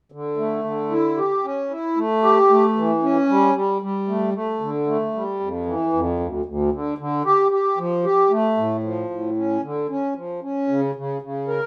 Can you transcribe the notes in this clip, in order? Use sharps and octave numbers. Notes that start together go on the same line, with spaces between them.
D3
A3
D3
E4
G4
C#4
E4
A3
G4
A3
E3
C#4
G3
G3
G3
A3
A3
D3
A3
G3
F2
E3
F2
D2
D2
D3
D3
G4
G4
F3
G4
A3
A2
F3
A2
C#4
D3
C#4
F3
C#4
C#3
C#3
C#3
A#4